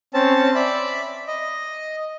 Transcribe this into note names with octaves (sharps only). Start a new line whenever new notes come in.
C4 C#4 A5
D5 E5 B5
D#5